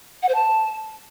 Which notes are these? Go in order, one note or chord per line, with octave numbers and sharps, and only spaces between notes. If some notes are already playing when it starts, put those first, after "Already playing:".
F#5
C5
A5